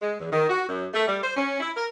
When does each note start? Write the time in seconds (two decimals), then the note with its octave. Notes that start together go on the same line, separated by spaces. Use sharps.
0.02 G#3
0.19 E2
0.32 D#3
0.48 F#4
0.68 F#2
0.94 A3
1.06 G3
1.22 C5
1.37 C#4
1.60 E4
1.76 A#4